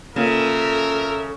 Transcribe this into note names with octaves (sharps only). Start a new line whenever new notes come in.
C#3 A#3 C4 F4 A4 A#4 E5